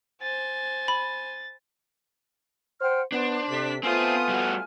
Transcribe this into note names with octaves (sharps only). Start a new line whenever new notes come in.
C5 G#5 A6
B5
C5 F#5 G5 F6
B3 D4 C5
C3 A4 B6
A3 B3 C4 F4 C5 G#5 D#6 F6
G3 F#4